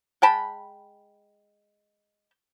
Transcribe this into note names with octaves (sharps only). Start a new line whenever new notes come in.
G#3 G5 A5 B5